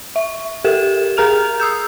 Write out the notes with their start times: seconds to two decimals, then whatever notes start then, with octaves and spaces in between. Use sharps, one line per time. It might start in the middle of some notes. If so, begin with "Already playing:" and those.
0.16 E5
0.64 G4 A4 A#4 E7
1.17 G#4 A#4 A#5 F6 F7
1.60 D#6 E6 G6